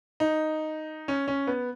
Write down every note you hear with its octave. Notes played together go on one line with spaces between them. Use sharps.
D#4
C#4
C#4
B3